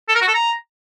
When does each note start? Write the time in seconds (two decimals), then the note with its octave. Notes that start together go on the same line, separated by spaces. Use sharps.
0.09 A4
0.15 A#4
0.21 F#4
0.28 A4
0.34 A#5